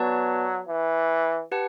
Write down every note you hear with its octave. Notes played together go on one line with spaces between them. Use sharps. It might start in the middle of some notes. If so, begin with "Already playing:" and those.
Already playing: F#3 B3 F#4 B4 D5 A5
E3
G4 B4 F#5 A5